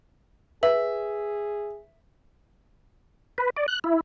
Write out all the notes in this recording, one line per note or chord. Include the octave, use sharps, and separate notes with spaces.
G#4 B4 E5
B4
D5
F#6
E4